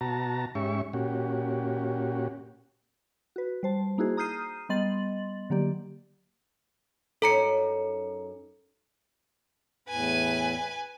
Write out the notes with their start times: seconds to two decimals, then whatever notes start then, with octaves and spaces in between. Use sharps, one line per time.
0.01 B2 F#4 A5 A#5
0.55 G#2 C#4 G4 E5 C#6
0.93 A#2 C#4 F#4 G4
3.36 F#4 B4
3.63 G3 C5 A5
3.98 A#3 D#4 E4 F#4 G#4 C5
4.17 A#5 D#6 F6 G6 C7 D#7
4.69 G3 B3 D#5 C6 A6 F#7
5.50 D3 F#3 A#3 G4 D5
7.22 F#2 C#4 D#4 A4 A#5 C#7
9.88 E2 A2 B4 G#5